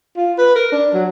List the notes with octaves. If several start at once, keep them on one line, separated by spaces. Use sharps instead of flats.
F4
B4
A#4
D4
F#3